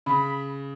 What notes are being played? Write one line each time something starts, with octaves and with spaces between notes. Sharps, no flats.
C#3 B5